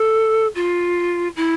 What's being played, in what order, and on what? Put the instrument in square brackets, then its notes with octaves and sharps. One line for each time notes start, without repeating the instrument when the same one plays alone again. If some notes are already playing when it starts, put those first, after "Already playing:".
Already playing: [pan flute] A4
F4
E4